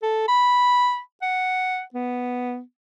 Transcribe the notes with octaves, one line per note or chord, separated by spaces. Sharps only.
A4
B5
F#5
B3